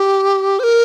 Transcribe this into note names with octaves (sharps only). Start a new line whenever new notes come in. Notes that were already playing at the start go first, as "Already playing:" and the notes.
Already playing: G4
C5
A#4